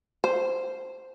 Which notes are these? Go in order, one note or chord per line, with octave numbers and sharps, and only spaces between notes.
C5